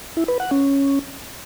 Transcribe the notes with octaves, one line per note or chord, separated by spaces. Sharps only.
E4
B4
F#5
C#4